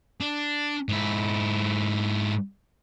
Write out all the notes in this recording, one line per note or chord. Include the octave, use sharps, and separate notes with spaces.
D4
G#2 E4